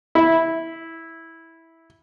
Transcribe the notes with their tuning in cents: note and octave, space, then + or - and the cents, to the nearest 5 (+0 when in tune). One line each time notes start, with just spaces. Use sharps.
E4 -10